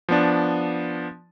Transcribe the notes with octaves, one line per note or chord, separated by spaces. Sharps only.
F3 B3 D4